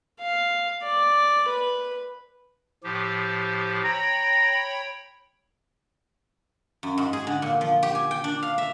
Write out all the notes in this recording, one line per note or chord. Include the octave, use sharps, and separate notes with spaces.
F5
D5
B4
A2 F3 G4
C#5 G5 A#5 B5
F#2
G#2
G#4
D3
A#2
F3
G4
G#5
G5
D4
F5
E5